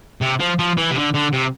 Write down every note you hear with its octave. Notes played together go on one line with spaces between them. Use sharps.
C3
F3
F3
E3
C3
D3
D3
C3